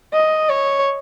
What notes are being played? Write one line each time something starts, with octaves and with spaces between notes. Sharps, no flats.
D#5
C#5